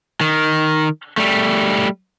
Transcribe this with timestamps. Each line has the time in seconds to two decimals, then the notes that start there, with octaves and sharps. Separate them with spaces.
0.21 D#3
1.18 G3 A3